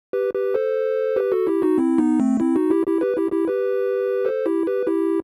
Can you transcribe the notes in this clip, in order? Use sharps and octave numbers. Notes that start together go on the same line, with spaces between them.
G4 B4
G4 B4
A4 C5
G4 B4
F#4 A4
E4 G4
D#4 F#4
C4 E4
B3 D#4
A3 C4
C4 E4
D#4 F#4
E4 G4
E4 G4
G4 B4
E4 G4
E4 G4
G4 B4
A4 C5
E4 G4
G4 B4
E4 G4